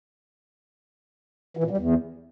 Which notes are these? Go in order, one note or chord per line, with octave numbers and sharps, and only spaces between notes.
E3
A#2
G3
E2